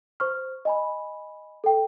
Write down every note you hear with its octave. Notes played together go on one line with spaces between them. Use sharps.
C5 C#6 F6
D#5 G#5 B5
A4 G5